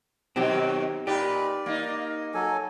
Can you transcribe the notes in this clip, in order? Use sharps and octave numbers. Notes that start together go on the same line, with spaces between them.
B2 D#3 F#3 C4 G4
A#2 D#4 G4 B4 D5
A#3 D#4
F#3 A4 G#5